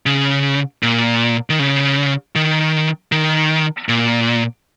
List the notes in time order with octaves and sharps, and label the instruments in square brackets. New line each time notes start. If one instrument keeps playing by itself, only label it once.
[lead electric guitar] C#3
A#2
D#3
C#3
D#3
D#3
A#2